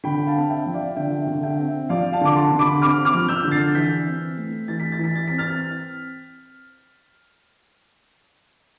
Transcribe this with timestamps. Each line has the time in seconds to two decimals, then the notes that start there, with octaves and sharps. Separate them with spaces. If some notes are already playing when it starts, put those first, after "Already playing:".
0.04 D3 G5 B5
0.27 F5 A5
0.35 C4
0.50 E5 G5
0.66 F3
0.74 D5 F5
0.96 D3 E5 G5
1.27 D3
1.43 E5 G5
1.58 C4
1.89 F3 D5 F5
2.13 F5 A5
2.21 D3 D6
2.36 A5 C6
2.52 D3
2.59 B5 D6
2.82 C4 D6 F6
3.05 D6 F6
3.14 F3
3.28 E6 G6
3.44 D3
3.51 A6 C7
3.75 E3 G6 B6
4.06 C4
4.38 A3
4.68 E3 A6
4.80 B6
4.92 A6
4.99 E3
5.04 B6
5.15 A6
5.28 C4 B6
5.38 F6 A6